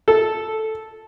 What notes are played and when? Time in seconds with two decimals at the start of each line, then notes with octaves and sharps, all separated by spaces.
0.08 A4